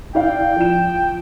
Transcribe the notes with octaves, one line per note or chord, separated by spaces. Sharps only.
E4 D5 F5 G5
F3 E7